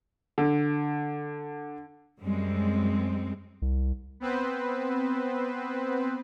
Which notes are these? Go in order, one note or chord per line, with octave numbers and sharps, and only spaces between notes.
D3
F#2 G3 G#3 C4
C2
B3 C4 B4 C5